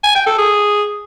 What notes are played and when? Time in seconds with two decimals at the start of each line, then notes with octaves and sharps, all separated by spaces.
0.03 G#5
0.15 G5
0.27 A4
0.38 G#4